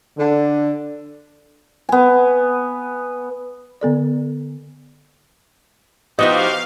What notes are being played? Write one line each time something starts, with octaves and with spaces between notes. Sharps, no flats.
D3
B3 G#5
D3 B3 A4 D5
F3 B3 D#4 F#4 G4 D#5 F5